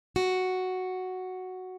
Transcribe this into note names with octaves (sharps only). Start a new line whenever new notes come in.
F#4